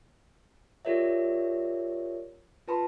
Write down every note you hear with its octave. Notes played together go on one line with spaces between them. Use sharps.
F4 G4 A#4 C#5 D5 E5
F4 B4 A5 B5 C6